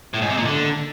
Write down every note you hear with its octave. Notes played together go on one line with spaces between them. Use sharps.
A2
G#2
C3
A#2
D3